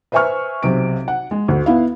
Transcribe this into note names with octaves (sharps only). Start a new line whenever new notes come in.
B4 C5 E5 G#5 C#6 F6
B1 C3 D7
F#5
G#3
D2
B3 E4 F5